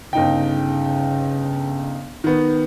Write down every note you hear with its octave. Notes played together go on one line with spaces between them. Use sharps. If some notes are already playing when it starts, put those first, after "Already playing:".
G1 C#3 D#4 G5
D#3 B3